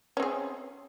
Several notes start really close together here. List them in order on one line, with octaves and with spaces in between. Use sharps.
C#4 C4 G#4